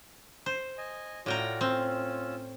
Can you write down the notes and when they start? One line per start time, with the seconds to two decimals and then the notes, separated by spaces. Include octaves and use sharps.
0.46 C5
0.78 D#5 G#5
1.26 A2 F4 F#4 D5 G5 A#5
1.61 C4 C#4 F4 E6